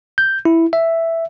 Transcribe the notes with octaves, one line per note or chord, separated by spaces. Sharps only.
G6
E4
E5